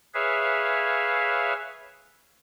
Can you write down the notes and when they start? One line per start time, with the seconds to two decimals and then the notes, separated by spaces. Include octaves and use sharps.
0.14 G#4 B4 C#5 E5 F5